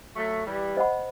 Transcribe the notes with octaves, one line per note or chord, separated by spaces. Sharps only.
F#3 A3
E3 G3
C5 D#5 F#5 B5